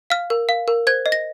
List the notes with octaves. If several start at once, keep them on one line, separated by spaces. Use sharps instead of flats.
F5 F6
A#4
F5
A#4
C5 G#6
D#5
A#6